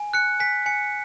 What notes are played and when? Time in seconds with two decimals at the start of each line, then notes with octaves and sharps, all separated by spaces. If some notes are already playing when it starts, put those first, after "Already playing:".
Already playing: G#5
0.13 F#6 C#7
0.40 G#5 B6
0.66 G#5 C#7